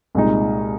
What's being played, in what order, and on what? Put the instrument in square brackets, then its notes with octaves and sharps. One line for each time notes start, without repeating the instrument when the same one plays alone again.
[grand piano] C2 A#2 G#3 D#4